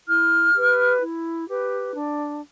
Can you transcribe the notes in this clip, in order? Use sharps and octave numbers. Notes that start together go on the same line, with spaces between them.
E4 F6
G4 B4
E4
G4 B4
D4